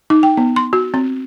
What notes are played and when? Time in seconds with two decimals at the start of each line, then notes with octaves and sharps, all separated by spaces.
0.10 D#4
0.23 G5
0.37 B3
0.56 C6
0.73 F#4
0.94 C4